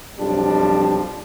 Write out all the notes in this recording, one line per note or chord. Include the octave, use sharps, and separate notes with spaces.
B1 F2 F3 G3 D4